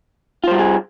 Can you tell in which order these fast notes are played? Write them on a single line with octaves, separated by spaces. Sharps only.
F4 C5 G3 F#4 G#4